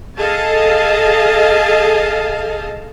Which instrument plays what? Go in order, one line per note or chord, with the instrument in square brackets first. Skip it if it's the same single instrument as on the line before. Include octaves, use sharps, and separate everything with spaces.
[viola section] G#4 A4 D#5 F5 A5